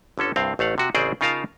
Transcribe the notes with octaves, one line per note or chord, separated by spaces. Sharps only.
G1 D3 C#4 A4
C2 G2 C4 F5
A1 A3 F5 F#5
C3 F#4
A1 C#3 C4 G#4 C5 D5
C#3 D#4 F4 A#4 F5 A5